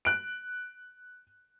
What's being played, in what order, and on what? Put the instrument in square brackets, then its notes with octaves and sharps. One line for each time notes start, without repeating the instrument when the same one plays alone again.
[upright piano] F#6 D7